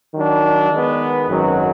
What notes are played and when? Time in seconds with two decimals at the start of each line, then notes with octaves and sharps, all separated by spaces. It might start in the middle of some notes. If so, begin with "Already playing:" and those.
0.13 D#3 F#3 D4
0.70 D#3 G#3 B3
1.28 G#1 F#2 D#3 F#3